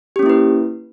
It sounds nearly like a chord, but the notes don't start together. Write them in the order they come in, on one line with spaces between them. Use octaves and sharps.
G4 C#4 A#3 E4 B4